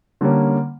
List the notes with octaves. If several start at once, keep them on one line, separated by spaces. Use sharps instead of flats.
D3 G3 A#3 C#4